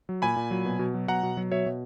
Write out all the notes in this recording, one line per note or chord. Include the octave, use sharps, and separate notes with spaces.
F#3
A#2 G#5 B5
A#2
F#3
B2
B2
F#3
B2 F#5 A#5
B2
F#3
B2 C#5 E5
B2